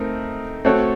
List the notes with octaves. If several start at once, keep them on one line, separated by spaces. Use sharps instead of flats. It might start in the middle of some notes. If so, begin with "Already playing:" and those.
Already playing: A3 C4 D#4 A#4
A3 C4 F#4 A4 C#5